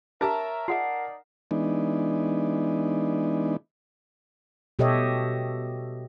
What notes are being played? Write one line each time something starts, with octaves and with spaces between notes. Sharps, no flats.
D4 G4 A#4 C#5 E5 A5 A#5
D#4 F4 G#4 D5 E5 F#5 C7
E3 G#3 B3 D4 D#4
B2 G4 A4 C#5 D#5 E5